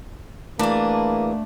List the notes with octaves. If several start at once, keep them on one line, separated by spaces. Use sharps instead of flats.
E3 A3 A#3 D4 G#4